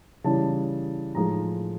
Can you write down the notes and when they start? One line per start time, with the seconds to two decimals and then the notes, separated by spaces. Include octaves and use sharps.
0.24 C#3 E3 G3 A5
1.15 A2 F3 G#3 A#5